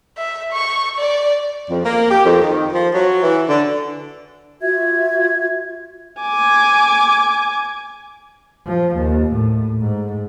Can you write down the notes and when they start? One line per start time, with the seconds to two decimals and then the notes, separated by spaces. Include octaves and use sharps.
0.17 E5
0.53 C#6
0.99 D5
1.69 F2
1.84 A#3
2.09 G4
2.24 F2
2.40 D#3
2.72 F3
2.93 F#3
3.22 E3
3.48 D3
4.62 F4 F#4 E5 G#6
6.22 G#5 D6
8.66 F3
8.96 D#2
9.31 A2
9.80 G#2